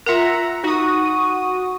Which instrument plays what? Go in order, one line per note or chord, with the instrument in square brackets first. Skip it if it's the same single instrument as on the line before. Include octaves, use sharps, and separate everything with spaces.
[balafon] F4 A#4 [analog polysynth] E5 F#5 A#5
[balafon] D#4 [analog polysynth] F#4 D#6